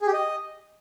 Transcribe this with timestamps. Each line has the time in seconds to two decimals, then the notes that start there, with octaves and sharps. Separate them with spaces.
0.01 G#4
0.07 G4
0.13 D#5